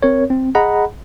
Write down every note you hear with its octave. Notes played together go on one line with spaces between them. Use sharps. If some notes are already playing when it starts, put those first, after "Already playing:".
C4 A#4 C#5
C4
G#4 D#5 F#5 A#5 B5